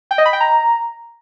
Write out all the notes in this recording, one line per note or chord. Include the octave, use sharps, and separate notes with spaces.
G5
D#5
B5
G5
A#5